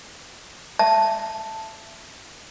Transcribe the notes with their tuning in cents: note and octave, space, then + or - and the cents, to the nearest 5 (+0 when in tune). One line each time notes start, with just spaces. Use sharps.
E5 +20 A5 +0